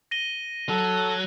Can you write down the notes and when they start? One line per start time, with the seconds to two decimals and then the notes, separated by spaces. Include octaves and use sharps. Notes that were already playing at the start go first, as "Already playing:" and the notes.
0.11 A#6 D#7 G7
0.69 F#3 A4